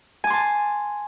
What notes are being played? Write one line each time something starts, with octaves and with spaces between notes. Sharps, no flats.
G#5 A5 C6 D6